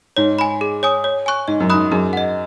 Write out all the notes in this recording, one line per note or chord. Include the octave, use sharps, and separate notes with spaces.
G#2 C#5
G#5 B5
G#4
C#5 G#5 D#6
C#5
G#5 C#6 F#6
G#2 D#5
F#2
G#2 B5 D#6 F#6
F#2 G#4
D#5 F#5